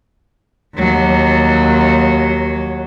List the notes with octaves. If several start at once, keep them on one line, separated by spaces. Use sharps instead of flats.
D#2 F#3